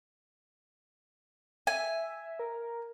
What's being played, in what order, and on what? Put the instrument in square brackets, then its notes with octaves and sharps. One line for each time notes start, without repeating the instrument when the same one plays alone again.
[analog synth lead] E5 [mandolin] G#5
[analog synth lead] A#4